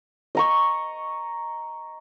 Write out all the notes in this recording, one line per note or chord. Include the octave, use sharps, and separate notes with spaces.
D#5 A#5 C#6